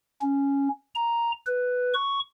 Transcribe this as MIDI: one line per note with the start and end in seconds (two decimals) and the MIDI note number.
0.22 0.69 61
0.95 1.32 82
1.46 1.94 71
1.94 2.19 85